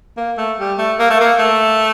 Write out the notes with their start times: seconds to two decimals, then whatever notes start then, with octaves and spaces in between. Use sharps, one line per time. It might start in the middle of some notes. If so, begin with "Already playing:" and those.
0.17 A#3
0.38 A3
0.59 G3
0.78 A3
0.99 A#3
1.10 A3
1.21 A#3
1.39 A3